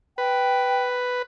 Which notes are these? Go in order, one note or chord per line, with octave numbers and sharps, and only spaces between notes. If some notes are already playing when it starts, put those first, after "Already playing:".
B4 G5